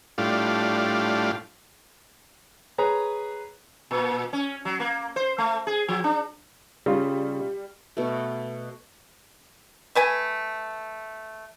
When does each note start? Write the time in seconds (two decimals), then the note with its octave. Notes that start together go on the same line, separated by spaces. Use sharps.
0.18 A2 G3 D4 F4
2.78 G#4 B4 C#5 A#5
3.91 A#2
4.33 C#4
4.65 F#3
4.80 A#3
5.16 C5
5.38 A3
5.67 G#4
5.88 F3
6.04 D4
6.86 C#3 G3 F4
7.97 B2 A3
9.95 A3 B4 G#5